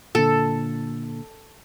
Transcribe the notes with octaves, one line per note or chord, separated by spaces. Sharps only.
A#2 D3 A4